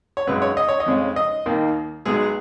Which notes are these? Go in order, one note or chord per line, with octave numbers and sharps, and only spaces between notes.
C#5
F#2 C#3 G#3 B4
C#5
D#5
C#5
D#5
F2 C#3 G#3 C#4
D#5
D#2 D#3 A#3
B1 B2 G#3 B3 G#4